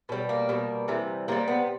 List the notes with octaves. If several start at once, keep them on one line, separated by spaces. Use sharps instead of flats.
B2 G3
A#3
B2 G3
C3 E3 G3
C3 E3 G3 A#3
B3